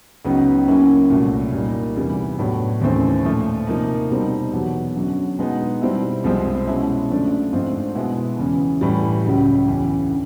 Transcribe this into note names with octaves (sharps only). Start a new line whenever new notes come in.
C#2 C#3 F#3 B3 D#4
C#3 F#3 A#3 C#4 E4
C2 A#2 F#3 A3
A#2 G3 A#3 D#4
E2 C3 E3 G3
A2 F#3 B3 D4
D#2 C#3 E3 A3 C4
A#2 F3 A3
C3 F3 A#3 D#4
B2 G3 C4 D#4
E2 B2 F#3 B3
F#2 D3 F#3
B2 G#3 B3 D#4
B2 G3 C4 E4
C2 C3 F3 G#3 C4
B2 G#3 C#4 E4
F#2 D3 F3 A3 D4
G#2 F3 A3 C4 F4
B2 G#3 B3 E4
E2 C#3 E3
A2 E3 G3
C#2 C#3 F#3
E2 C#3 E3
D3